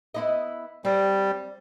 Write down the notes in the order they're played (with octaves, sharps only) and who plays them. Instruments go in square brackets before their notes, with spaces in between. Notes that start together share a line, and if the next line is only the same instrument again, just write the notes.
[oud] B3 E4 D#5
[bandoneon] G3 [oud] C4